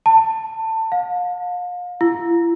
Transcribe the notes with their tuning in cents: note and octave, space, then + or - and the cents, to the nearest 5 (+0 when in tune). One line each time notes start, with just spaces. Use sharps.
A5 +20
F5 +35
E4 +45